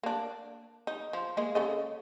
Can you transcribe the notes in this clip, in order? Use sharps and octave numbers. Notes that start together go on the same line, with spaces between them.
A#3 D4
D#4
F3
G#3 A#3 D#5
C#3 A4 D#5